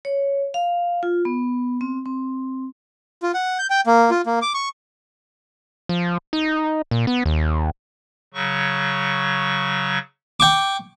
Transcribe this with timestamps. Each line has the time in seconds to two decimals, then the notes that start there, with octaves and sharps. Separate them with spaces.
0.05 C#5
0.54 F5
1.03 F4
1.25 B3
1.81 C4
2.06 C4
3.23 F4
3.34 F#5
3.59 G6
3.70 G5
3.87 A#3
4.11 F4
4.26 A#3
4.42 D6
4.54 C#6
5.89 F3
6.33 D#4
6.91 A#2
7.07 B3
7.26 D#2
8.34 C#3 F#3 C#6
10.40 G5 C#6 D6